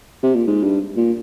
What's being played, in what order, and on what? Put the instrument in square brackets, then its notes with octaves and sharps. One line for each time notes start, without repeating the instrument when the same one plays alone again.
[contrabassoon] C3
A#2
G#2
G2
A#2